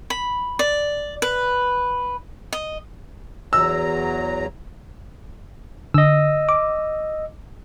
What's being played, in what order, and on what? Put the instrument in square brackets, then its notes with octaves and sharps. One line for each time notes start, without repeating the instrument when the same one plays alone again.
[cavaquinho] B5
D5
B4
D#5
[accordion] E2 F#3 A#5 [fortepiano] E6
[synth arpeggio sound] D3 [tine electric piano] D#5 E6
[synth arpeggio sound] D6